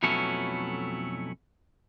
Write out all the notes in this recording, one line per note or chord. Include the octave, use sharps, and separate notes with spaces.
F2 B2 F#3 A3 C#4 E4